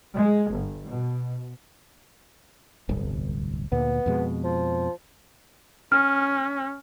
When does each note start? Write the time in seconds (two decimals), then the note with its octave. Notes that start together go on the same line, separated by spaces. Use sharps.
0.17 G#3
0.51 G1
0.87 B2
2.89 D1 G1 C2
3.72 D2 A#2 B3
4.06 F2 B2 G#3
4.44 F3
5.92 C#4 F6